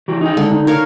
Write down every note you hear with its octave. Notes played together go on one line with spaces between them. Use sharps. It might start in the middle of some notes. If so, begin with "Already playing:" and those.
E3 F#4 G4
D#4 G#4 G5
C#2 D3 G#3
D#4
A#4 C#5 F5